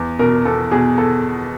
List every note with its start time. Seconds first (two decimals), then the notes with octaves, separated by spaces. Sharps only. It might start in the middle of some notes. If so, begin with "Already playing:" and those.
Already playing: E2
0.19 B2 A#4
0.45 E2 A4
0.71 B2 G#4
0.98 A4